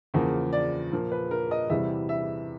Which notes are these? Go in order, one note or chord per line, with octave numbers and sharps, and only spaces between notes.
E2 C#3 F3 A#3
D5
A#2 F3 A#3
B4
A#4
D#5
E2 C3 E3 G3 E5
E5